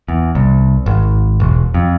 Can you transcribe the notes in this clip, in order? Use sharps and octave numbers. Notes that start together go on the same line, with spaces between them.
E2
C2
G#1
E1
F2